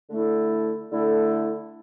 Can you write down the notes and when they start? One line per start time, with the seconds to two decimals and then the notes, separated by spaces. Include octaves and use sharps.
0.10 D3 A3 E4 A4
0.90 D3 A3 E4 A4